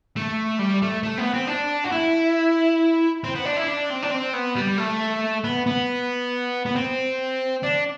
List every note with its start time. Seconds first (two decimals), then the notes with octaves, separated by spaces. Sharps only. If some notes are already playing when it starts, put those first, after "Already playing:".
0.16 A3
0.59 G3
0.82 A3
1.03 A3
1.18 B3
1.34 C4
1.47 D4
1.84 F#4
1.92 E4
3.24 C4
3.35 B3
3.45 D4
3.57 E4
3.68 D4
3.90 C4
4.02 D4
4.11 C4
4.33 B3
4.56 G3
4.78 A3
5.44 B3
5.66 B3
6.65 B3
6.75 C4
7.63 D4